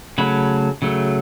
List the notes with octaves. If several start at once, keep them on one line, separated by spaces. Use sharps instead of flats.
C#3 F#3 A3 B5
C#3 F#3 A3